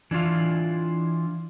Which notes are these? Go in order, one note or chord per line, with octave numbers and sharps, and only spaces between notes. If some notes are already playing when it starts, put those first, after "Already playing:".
E3 D4 E4 F4 F5